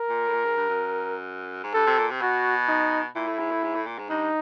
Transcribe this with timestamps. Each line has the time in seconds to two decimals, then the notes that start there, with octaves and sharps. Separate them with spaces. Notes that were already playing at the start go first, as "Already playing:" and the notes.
Already playing: A#4
0.09 A#2
0.27 A2
0.33 A#2
0.45 G#2
0.57 G2
0.69 F#2
1.63 G#2
1.74 G2 A4
1.87 C3
1.98 A#2
2.10 C3
2.21 B2 F#4
2.68 D#4
3.15 A#2 E4
3.27 A2
3.39 G#2
3.51 A2
3.63 G#2
3.75 A2
3.86 A#2
3.99 G#2
4.10 G2 D#4